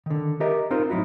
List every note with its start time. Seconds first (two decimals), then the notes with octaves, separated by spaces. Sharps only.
0.06 D3 D#3
0.40 G4 A#4 D#5 E5
0.71 C4 D#4 F4 A#4 C5
0.90 A2 F#3 D#4 E4 F#4